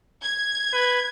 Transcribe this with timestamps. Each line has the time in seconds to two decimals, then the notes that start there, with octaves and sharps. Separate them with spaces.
0.22 G#6
0.73 B4